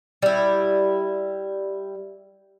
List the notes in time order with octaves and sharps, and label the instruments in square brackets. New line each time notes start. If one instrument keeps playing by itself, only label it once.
[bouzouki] G3 E4